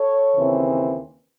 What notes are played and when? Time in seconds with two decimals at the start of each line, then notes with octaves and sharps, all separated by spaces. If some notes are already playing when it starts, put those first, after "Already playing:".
Already playing: A4 C#5
0.34 D#2 C#3 E3 C4